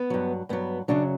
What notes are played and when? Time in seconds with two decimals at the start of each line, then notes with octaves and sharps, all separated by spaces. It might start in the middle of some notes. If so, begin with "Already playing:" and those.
Already playing: B3
0.10 G2 F#3
0.49 G2 F#3 B3
0.88 F#2 C#3 F#3 D4